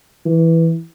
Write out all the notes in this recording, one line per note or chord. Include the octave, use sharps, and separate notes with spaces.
E3